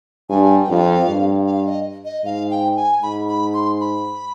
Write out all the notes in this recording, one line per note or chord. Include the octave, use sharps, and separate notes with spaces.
G2 G#5
G5
F2 F5
G2
F5
D#5
D#5
G#2 F5
G5
G#5
G#2 B5
B5
C6
B5